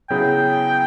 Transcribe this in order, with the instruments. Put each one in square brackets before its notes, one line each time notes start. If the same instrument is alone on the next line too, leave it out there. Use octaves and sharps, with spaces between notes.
[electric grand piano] C#3 F#3 B3 E4 G#4 [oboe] G5